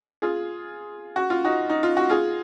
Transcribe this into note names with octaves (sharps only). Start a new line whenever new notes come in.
F4 G#4
F#4
F4
D#4 F#4
D#4
F4
F#4
F4 G#4